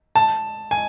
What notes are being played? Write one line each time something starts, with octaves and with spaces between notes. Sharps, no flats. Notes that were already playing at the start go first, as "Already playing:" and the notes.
A5
G#5